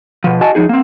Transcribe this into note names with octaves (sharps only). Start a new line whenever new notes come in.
B2 F3
F#4 D#5 G#5 A5
F3 G3 D#4 G#4
A#3 C4